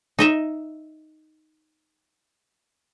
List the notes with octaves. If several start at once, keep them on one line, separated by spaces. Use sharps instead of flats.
D#4 D#5 E5